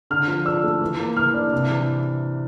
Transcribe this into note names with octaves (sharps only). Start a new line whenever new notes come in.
D3 F6
F3
D4 E6
A3
E3
A#3
E3 F6
D4
C3
E3